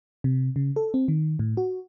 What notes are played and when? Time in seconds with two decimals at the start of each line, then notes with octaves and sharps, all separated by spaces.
0.24 C3
0.56 C#3
0.76 A4
0.94 C4
1.08 D#3
1.39 A2
1.57 F#4